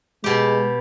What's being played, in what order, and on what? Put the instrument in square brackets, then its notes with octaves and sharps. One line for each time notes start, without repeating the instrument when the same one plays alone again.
[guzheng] B2 G4 [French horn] G#3